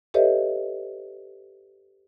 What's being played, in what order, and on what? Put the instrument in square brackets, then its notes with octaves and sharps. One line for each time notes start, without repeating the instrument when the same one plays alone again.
[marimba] G4 A4 B4 C#5 D#5 E5